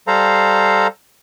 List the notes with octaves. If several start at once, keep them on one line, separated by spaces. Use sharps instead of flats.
G3 A4 C5 F5 A#5